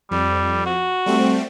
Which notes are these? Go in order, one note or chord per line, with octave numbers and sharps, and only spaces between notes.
F2 G3
F#4
G3 A3 C4